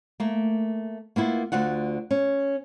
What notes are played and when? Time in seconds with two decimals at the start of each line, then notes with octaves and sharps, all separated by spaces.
0.20 A3 A#3
1.16 A#3 B3 E4 F4
1.52 D2 D3 F4 F#5
2.11 C#4